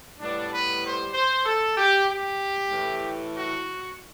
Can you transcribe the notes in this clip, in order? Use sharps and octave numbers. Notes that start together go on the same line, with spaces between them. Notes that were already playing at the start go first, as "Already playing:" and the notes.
A2 G3 B3 D4
B4
C5
C5
A4
G4
G4
A2 E3 A3
F#4